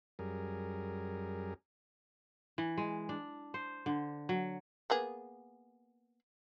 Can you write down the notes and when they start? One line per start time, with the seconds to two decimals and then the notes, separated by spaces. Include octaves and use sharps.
0.19 F#2 G3 G#4 A#4
2.58 E3
2.78 G#3
3.09 D4
3.54 C5
3.86 D3
4.29 F#3
4.90 A#3 B3 G#4